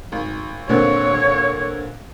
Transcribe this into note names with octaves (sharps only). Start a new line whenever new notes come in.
G#1
A#2 D3 C4 C#5